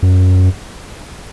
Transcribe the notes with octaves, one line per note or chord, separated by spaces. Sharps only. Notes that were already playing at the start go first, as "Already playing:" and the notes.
F#2